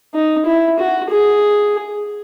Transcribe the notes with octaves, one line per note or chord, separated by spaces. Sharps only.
D#4
E4
F#4
G#4